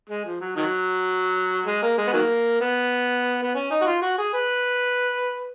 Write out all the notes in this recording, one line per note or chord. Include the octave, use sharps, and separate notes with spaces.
G#3
F3
F#3
D#3 F#3
G#3
A#3
G#3
B3
D#3 F#3 A#3
B3
B3
C#4
D#4
F#4
F4
F#4
G#4
B4